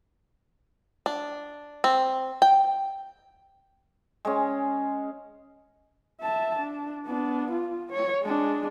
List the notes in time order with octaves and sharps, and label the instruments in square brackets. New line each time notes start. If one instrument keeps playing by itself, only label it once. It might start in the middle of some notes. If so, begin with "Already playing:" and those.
[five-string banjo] D4
C4
G5
[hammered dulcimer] G#3 C#4
[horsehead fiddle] E5 A5
D4
B3 D4
F4
C#5
G#3 D4